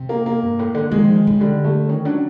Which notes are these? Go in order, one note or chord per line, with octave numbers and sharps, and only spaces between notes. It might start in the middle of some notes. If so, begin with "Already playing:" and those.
Already playing: C3
A#3
A#3
G2
A2
D3
D#3 G#3
F3
D#3
C#3
D3 G3
A3
D#3 C#4
F#3 D4